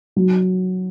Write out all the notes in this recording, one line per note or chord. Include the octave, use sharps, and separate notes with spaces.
F#3